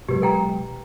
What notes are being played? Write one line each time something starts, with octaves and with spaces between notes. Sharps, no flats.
B2 F#3 G#3 G4 B4
A4 G5 A#5